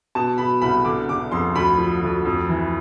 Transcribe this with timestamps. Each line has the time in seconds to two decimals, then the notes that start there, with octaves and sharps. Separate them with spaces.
0.15 B2 A5
0.38 B2 B5
0.62 C2 B5
0.85 D3 D6
1.09 D3 D6
1.32 F2 C6
1.55 D2 B5
1.78 F3
2.03 D2
2.25 F2
2.49 E3